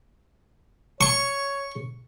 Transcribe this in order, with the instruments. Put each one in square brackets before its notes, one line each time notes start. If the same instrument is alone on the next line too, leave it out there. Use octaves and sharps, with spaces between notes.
[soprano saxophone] C#5 [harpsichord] C#6